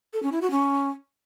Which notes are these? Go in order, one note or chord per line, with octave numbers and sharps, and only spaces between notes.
A4
C#4
E4
F#4
C#4